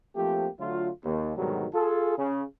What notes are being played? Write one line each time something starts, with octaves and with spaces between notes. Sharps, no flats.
F3 A3 A#3 C4 G4
D3 F#3 A3 F4
D#2
G#2 B2 D3 D#3 F#3 G3
F4 G#4 A4
C#3